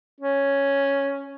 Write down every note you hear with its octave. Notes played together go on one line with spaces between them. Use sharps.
C#4